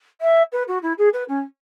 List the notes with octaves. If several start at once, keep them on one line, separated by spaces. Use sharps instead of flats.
E5
B4
F#4
E4
G#4
B4
C#4